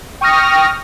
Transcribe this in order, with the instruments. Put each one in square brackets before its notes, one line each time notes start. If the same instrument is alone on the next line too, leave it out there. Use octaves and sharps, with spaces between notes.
[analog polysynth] G5 C#6 D#6 F6 A#6